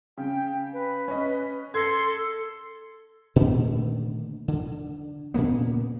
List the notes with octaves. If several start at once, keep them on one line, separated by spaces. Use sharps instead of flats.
C#3 G5
B4
C#4 D#5
A4 C6 G#6 A#6
A#2 D3 D#3 A3
D3
A#2 C#3 A#3 B3